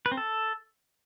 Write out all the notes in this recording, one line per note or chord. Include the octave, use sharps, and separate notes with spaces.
B4
C4
A4